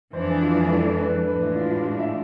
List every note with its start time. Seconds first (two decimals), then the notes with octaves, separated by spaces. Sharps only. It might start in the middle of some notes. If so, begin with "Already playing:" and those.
0.13 F2 E3 G#3 D4 C5
0.28 G#4
0.42 F4
0.51 E4
0.60 G#4
0.70 A4
0.98 B4
1.27 A2 E3 G#3 D4 B4
1.42 E4
1.55 F4
1.71 F4
1.84 F4
1.99 E5